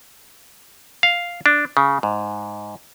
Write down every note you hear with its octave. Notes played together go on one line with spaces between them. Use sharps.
F5
D4
C#3
G#2